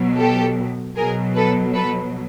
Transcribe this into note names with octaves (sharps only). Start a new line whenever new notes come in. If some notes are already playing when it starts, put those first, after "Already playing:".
Already playing: B2 F#3
G4 A4
B2 F#3 G#4 A#4
A4 B4
A4 B4